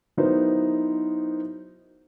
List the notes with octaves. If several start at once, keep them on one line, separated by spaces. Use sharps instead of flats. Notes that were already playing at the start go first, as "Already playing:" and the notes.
F#3 B3 D#4 E4 A#4 C5